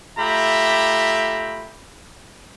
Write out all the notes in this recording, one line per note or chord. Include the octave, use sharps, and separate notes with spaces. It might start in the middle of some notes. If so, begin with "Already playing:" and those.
A3 F4 G4 E5 A#5 B5